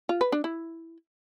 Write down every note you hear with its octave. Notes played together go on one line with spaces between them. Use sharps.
F4
B4
D4
E4